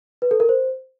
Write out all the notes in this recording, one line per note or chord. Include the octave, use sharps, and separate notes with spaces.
B4
A4
A#4
C5